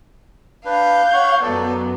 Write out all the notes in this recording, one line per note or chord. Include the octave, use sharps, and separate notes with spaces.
D4 B4 F5 G6
C#5 F#5 C#6
F#2 F#3 B3 A4 D5